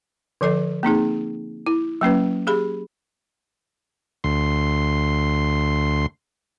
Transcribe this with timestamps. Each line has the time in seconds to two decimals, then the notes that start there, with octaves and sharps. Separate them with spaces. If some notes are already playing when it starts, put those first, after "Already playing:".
0.41 D3 F3 A4 D#5
0.83 A#3 C4 D#4 G#4
1.67 E4
2.01 F#3 A#3 C#4 B4
2.47 G4 G#4 B5
4.24 D2 C6